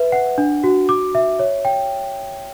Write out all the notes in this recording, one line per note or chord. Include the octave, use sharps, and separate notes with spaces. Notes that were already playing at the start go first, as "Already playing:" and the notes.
Already playing: B4 E5
F#5
D4
F#4
D6
E5
C#5
G5